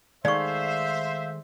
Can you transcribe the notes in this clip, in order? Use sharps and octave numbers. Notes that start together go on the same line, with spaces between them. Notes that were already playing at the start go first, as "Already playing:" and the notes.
D#3 G#3 A3 C5 D5 E5 F5 C#6